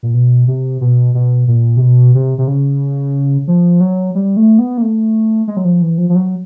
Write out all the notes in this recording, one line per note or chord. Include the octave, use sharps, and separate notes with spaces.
A#2
B2
C3
B2
B2
A#2
C3
B2
C3
C3
C#3
F3
F#3
G3
A3
B3
A#3
A3
G#3
F#3
F3
E3
F3
F3
F#3